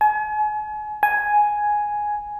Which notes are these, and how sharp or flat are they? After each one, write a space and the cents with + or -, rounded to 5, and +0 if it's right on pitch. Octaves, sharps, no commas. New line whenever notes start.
G#5 +40
G#5 +5